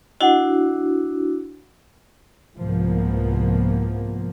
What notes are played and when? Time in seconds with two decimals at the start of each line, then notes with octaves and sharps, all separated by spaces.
0.21 D4 E4 F#4 D#5 F#5
2.59 C2 G#2 F3 A#3 B3